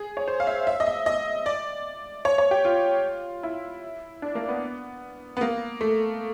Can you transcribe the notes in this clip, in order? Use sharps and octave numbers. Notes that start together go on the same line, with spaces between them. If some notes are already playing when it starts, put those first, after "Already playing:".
Already playing: G#4
C#5
C5
F5
E5
E5
D#5
E5
D#5
D5
C#5
C#5
G4
F4
E4
D4
A#3
B3
B3
A#3
A3